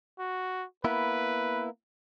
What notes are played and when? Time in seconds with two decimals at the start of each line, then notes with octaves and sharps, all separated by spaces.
0.19 F#4
0.84 A#3 B3 E4 B4